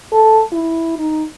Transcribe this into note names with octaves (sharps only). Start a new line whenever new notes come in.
A4
E4
D#4